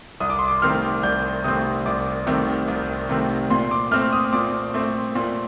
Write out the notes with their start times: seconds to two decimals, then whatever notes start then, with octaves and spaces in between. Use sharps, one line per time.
0.20 C2 D#6
0.30 D6
0.39 C6
0.48 D6
0.62 C3 D#3 A3 C4 F6
1.03 C2 G6
1.44 C3 D#3 A3 C4 D#6
1.86 C2 D6
2.26 C3 D#3 A3 C4
2.68 C2
3.09 C3 D#3 A3 C4
3.50 A#2 C6
3.71 D6
3.91 A3 C4 F6
4.13 D#6
4.33 A#2 D6
4.74 A3 C4
5.15 A#2